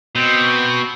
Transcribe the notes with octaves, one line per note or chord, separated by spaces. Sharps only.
B2 C4